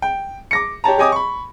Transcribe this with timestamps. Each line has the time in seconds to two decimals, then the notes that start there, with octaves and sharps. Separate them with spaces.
0.02 G5
0.51 D6 A#6 C#7
0.84 G4 C#5 A5 A#5
0.98 G4 C#5 D#5 G#5 D6 D#6
1.12 B5 C#6